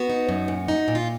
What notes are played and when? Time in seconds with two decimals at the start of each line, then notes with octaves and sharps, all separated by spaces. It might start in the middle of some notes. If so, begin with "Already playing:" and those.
Already playing: B3 F#4
0.09 D#4
0.29 F#2
0.48 A#2
0.68 D#4
0.88 A#2
0.95 F4